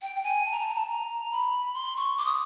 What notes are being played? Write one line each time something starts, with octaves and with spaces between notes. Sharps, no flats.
G5
G5
G#5
A5
A#5
A5
A#5
A5
A#5
B5
C6
C#6
D6
D#6